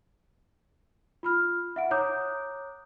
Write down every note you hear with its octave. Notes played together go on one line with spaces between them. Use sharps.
F4 B5 F6
E5 F#5 D7
C#5 A#5 D6 D#6 F#6 G6